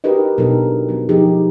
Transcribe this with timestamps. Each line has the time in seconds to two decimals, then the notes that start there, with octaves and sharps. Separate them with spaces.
0.04 D#4 F#4 G4 A#4 B4 D#5
0.38 B2 F#3 D4 D#4 A4 A#4
0.89 F#3 B3
1.09 F3 D#4 G4 G#4